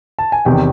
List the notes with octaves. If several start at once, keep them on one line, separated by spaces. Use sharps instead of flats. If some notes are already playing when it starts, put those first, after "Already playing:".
A5
G#5
E2 C3 D#3 G5